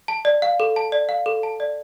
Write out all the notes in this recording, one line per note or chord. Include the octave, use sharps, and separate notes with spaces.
A5
D5
F5
A4
A5
D5
F5
A4
A5
D5